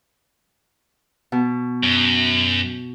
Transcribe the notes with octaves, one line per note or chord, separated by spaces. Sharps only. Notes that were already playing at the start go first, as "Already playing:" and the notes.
B2
F#2